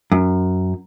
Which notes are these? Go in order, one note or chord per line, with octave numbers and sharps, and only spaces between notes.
F#2